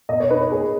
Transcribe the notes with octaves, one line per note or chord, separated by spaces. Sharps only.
B2 D#5
C#5
D#4 B4
B4
A#3 G#4